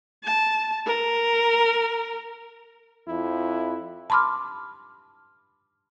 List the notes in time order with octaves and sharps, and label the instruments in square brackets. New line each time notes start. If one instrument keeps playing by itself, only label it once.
[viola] A5
A#4
[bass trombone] F2 [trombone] E4
[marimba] A5 B5 C6 D6 F6